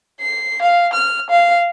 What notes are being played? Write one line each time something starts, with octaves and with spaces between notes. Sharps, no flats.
C7
F5
F6
F5